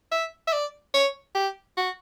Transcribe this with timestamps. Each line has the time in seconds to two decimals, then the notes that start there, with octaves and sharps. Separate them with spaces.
0.12 E5
0.47 E5
0.53 D5
0.94 C#5
1.35 G4
1.77 F#4